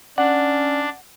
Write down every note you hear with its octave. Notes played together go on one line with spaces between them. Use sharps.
C#4 D4 D5 F#5